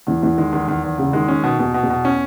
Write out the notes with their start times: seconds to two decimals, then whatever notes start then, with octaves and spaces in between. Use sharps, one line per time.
0.07 E2 E3
0.23 E2 E3
0.38 D#3 G#3
0.53 E2 D#3
0.68 E2 D#3
0.84 E2
0.98 E2 C#3
1.13 D#3 G#3
1.28 D#3 C#4
1.43 B2
1.59 E2 B2
1.74 B2
1.83 E2
1.90 B2
2.05 C#4